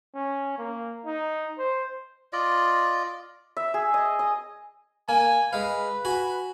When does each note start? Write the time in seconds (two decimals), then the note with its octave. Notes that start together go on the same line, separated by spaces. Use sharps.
0.14 C#4
0.58 A#3
1.05 D#4
1.58 C5
2.33 F4 D5 D#5
3.57 E5
3.74 G#4
3.94 D#5
4.19 D#5
5.09 A#3 G#5
5.53 G#3 B4 F5
6.05 F#4 G#5